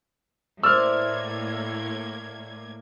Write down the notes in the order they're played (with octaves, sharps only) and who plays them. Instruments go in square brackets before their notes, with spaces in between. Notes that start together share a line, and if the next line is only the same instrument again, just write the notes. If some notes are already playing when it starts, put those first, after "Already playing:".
[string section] A2 A#3 G#6 [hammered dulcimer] C5 D5 E5 [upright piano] E6 F6